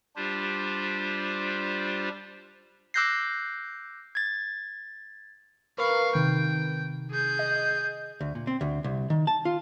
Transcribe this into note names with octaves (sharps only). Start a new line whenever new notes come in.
G3 D4 F4 G4 C5
D6 E6 F#6 G6 A#6 C7
G#6 A6
A#4 B4 F5 C#6
C3 D#3 G5
G#4 G6
D#5
D2
A#2
C4
D2
C2
D#3
A5
F4